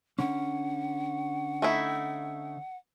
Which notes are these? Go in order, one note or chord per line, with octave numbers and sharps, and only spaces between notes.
D3 C#4 F#5
A3 D#4 E4